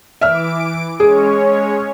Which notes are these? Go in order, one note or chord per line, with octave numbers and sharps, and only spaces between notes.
E3 E5 D6 F6 D7
G#3 C#4 G#4 C#5